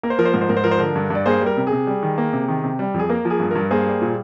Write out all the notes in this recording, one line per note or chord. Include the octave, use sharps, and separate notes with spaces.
A#3 A#4
C5
F3 A#4
C5
G#2 A#4
C5
G#2 A#4
C5
F3 A#4
C5
D3 A#4
G2
G2
D5
A#3 G#4 C5
G3
A#4
C3
G#4
C3
G3
D#3
A#3
C3
D#3
C3
G3
F2
G#4
A#3 A#4
F3
G#4
G2
G2 A#4
A#3 G#4 C5
G3
A#2